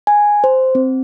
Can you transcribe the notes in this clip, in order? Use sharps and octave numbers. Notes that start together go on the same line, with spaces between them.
G#5
C5
C4